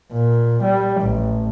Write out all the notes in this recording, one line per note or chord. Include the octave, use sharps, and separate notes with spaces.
A#2
G3
A1